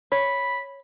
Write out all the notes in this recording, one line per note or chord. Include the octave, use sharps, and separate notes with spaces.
C#5 B5